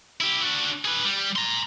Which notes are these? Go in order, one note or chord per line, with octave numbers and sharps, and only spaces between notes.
E4 G4
D4 F#4
G#4 B4
G3
A#5 C6